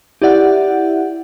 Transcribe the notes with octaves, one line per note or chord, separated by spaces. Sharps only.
E4 G4 D5 E5 F#5